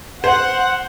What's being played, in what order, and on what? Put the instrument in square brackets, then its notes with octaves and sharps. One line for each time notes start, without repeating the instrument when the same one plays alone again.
[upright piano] C5 [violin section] F#5